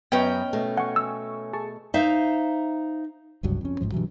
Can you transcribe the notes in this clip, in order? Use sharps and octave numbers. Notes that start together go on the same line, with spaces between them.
F#2 F#3 B3 C#4 B4 D#5 G5
B2 A3
F#5 G#5 C#6
E6
G#4 A5 C#6
D#4 C5 E5 F5
F1 C#2 G2 F#3
F2 C#4
A1 G#2 F3
G2 B2 E3 F#3